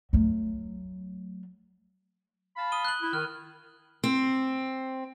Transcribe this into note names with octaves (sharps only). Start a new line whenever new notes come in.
F#3 A3
F5 A5 B5
D#6 D#7 G7
F#6 F#7
E4
D#3 F6
C4